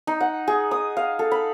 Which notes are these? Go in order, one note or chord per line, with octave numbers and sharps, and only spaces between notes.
D#4
F#5
G#4
D#6
F5
A4
B5